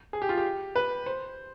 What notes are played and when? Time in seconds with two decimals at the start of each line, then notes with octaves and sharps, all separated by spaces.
0.13 G#4
0.22 G4
0.29 F4
0.37 G4
0.76 B4
1.06 C5